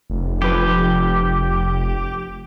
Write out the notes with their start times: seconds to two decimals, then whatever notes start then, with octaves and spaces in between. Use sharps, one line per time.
0.10 F1
0.42 F3 G4 A4 B4